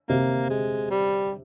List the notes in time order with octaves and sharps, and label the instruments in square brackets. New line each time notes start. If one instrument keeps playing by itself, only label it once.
[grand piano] C3 [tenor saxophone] A#3
[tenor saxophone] G#3
G3